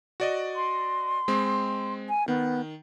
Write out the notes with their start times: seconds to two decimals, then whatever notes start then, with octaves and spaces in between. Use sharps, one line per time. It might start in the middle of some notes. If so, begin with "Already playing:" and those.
0.20 F#4 D5 D#5
0.56 C6
1.28 G#3 C4
2.09 G#5
2.28 D#3 B3